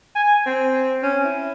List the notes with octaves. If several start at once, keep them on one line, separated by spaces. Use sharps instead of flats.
G#5
C4
C#4
E4